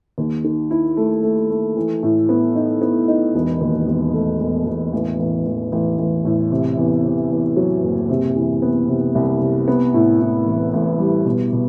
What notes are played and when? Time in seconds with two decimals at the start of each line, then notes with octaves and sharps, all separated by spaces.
0.18 D#2
0.44 D#3
0.71 E4
0.97 A3
1.23 A3
1.50 A3
1.76 E3
2.03 A2
2.29 B3
2.56 D#4
2.81 B3
3.08 D#4
3.35 E1
3.61 D#2
3.87 E1
4.13 A3
4.40 E1
4.66 E1
4.93 A1
5.19 A1
5.46 A1
5.72 A1
5.98 A1
6.25 A2
6.51 C3
6.77 E2
7.04 C3
7.30 E2
7.56 F#3
7.83 F#1
8.09 C3
8.36 E3
8.62 B3
8.88 C3
9.15 C2
9.41 C3
9.68 B3
9.94 A2
10.20 A2
10.46 A1
10.73 A1
10.99 G3
11.26 B2
11.53 B2